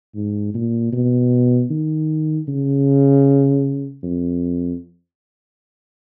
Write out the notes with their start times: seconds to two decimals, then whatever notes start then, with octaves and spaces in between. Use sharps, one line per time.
0.15 G#2
0.54 A#2
0.92 B2
1.70 D#3
2.48 C#3
4.03 F2